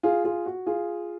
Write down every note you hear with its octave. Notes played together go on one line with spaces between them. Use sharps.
F4 G#4
F4 G#4
F#4
F4 G#4